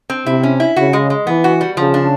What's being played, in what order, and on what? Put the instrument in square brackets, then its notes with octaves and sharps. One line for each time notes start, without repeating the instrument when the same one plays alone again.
[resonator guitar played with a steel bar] C4
[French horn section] C3 [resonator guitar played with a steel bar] E4
[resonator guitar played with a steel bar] C#4
E4
[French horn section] C#3 [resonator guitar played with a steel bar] F#4
[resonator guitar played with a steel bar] G#3
G#3
[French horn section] E3 [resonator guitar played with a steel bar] B3
[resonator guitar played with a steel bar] F#4
G3
[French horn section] C#3 [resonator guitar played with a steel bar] F3
[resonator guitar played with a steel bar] D4